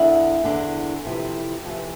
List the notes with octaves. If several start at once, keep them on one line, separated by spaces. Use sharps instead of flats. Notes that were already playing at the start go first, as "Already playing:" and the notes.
Already playing: E2 D3 E4
E2 D3
F2 C3 E3
F2 C3 E3